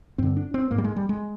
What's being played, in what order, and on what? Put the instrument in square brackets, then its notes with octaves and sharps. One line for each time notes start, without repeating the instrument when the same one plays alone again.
[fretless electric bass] G2 D3 C4
D4
C4
G#2 A#3
G3
G#3
G3
G#3